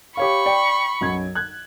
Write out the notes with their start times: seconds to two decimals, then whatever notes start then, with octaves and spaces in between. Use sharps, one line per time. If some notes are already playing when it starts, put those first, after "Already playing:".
0.17 G4 C#5 F5 B5 C#6
0.46 D5 G5
1.01 B1 F#2 G#6
1.35 F#6 G#6